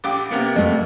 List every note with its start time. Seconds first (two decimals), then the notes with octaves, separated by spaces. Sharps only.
0.04 A#1 G4 D6
0.31 C3 A#3 B3
0.55 F2 A3